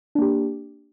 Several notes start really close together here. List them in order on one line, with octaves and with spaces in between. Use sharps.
D4 A#3 G4